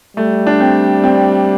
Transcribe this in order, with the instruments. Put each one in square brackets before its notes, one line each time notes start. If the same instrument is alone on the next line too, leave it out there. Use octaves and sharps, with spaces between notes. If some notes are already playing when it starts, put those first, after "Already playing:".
[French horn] G3 [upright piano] A3
[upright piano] D4
C4
C4